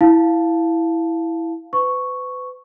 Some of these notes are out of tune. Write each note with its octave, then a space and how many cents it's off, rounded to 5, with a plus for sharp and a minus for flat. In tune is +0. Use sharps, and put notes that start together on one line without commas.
E4 +0 F5 +0 A5 -5
B4 +35 C#6 +0